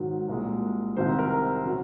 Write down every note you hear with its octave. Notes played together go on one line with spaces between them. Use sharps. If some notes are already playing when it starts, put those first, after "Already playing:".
Already playing: G#2 D#3 F#3
C2 A#2 G#3
C2 C3 D#3 C5
A#4
C#3 F#3